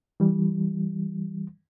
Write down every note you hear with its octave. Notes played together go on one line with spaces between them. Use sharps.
E3 G3